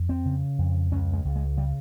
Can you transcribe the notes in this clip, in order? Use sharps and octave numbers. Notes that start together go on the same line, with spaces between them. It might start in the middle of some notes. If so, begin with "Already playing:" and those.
Already playing: F2
C4
C#3
F2
C#2 C#4
G#3
C#2
G#3
C#3 G3